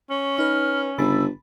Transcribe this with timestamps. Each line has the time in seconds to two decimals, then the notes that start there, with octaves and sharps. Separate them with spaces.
0.10 C#4 C#6
0.38 D#4 B4 F6
0.98 G1 C#3 B5 E6 A6